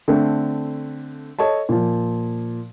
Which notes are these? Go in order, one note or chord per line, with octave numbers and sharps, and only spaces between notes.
D3 A3 C4
A4 C#5 D#5 A5
A#2 F3